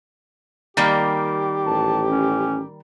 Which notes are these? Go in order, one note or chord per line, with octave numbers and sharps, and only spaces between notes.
D#3 G3 A#3 G4
A1 A5
C#4